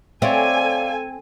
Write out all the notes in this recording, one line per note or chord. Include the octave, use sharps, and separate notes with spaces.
C4 A4 C#5 D5 E5 F5 G#5